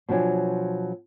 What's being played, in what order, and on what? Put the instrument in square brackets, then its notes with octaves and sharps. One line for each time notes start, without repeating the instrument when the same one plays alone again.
[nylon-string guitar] B2 F3 F#3 D4 G#5